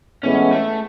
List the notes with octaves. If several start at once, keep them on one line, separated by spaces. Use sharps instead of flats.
A2 E3 G#3 B3 C#4
A3